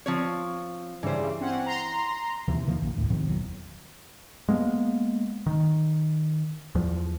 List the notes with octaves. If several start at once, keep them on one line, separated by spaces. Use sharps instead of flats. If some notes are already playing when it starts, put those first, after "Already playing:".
F3 C4 C#5
G2 C#3 E3 G3 C5
C4 C#4 F#5
A#5 C6
D#2 C3 E3
D#3 F3 A#3
A#1 F#2
G#1 D2 A2
B2 D#3 F3 C4
G1 E2 F#3
G#3 A#3 B3
D#3
E2 F3